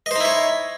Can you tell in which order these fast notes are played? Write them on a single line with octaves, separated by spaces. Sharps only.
D#5 C5 D#4 E4 C#5